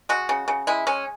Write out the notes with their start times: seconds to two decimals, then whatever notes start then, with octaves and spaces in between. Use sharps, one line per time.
0.09 G#3 F#4
0.29 C#3
0.48 C#3
0.67 G#3 E4
0.87 G#3 C#4